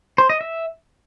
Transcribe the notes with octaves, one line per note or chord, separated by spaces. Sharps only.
C5
D#5
E5